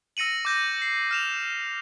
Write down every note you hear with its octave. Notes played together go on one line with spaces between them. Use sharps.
E6 A#6 C#7 D#7 F#7
D6 G6 A#6
C7
F6 E7 F7